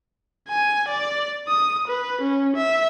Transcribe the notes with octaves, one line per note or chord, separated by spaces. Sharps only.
G#5
D5
D#6
B4
C#4
E5